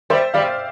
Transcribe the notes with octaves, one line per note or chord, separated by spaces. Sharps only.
G3 C5 E5
G3 D5 F5